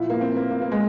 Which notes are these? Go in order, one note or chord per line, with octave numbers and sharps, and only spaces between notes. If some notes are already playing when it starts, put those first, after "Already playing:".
Already playing: A#2 F3 E4
A#3
C4
A#3
A#3
A#3
G#3